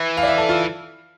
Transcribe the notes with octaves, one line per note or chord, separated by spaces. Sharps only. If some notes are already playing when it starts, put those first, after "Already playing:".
Already playing: E3 E5
F5
D5
E5
A4
F4